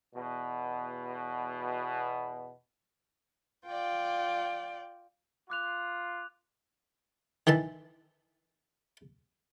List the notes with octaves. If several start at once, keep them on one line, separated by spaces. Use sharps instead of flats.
E2 B2
F4 D5 G5
F4 D6 F#6 F7
D#3 E3 E5 A5